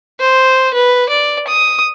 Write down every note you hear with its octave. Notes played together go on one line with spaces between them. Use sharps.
C5
B4
D5
D#6